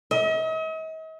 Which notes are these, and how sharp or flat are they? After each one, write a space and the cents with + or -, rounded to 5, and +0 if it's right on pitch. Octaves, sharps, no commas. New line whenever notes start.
D#5 +45